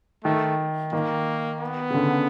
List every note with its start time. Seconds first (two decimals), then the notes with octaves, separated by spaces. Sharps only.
0.24 D#3 A3
0.93 D#3 A#3
1.60 B3
1.90 C#3
1.94 D3